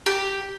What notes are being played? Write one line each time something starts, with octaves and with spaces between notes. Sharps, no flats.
G4